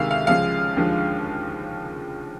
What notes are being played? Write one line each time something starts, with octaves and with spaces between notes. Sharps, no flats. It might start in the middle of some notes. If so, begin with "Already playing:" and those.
Already playing: D2 C3 D#3 G#3 E5 F5
F5
C#2 C#3 F3 G#3 F5
D#2 D3 F3 G#3